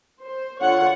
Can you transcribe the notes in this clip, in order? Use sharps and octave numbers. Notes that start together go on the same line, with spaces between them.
C5
D3 F4 C#5 F#5